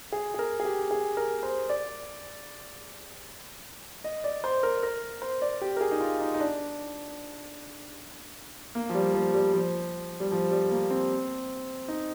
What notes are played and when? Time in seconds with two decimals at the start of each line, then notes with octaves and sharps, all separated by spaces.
0.12 G#4
0.34 G#4
0.39 A#4
0.60 G#4
0.65 G4
0.91 G#4
1.17 A#4
1.43 C5
1.69 D5
4.04 D#5
4.24 D5
4.44 C5
4.63 A#4
4.83 A#4
5.22 C5
5.42 D5
5.61 G4
5.76 A#4
5.81 G#4
5.91 D#4
6.01 F4
6.20 D#4
6.34 D#4
6.40 D4
8.75 A#3
8.89 F3
8.95 G3
9.14 F3
9.34 G3
9.53 F3
10.20 G3
10.32 F3
10.51 G3
10.71 A#3
10.91 C4
11.88 D#4